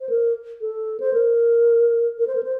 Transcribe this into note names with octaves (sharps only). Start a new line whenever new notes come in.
C5
A#4
A4
C5
A#4
A#4
C5
A#4
C5